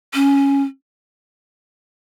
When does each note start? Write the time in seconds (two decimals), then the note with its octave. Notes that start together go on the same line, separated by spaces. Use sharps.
0.14 C#4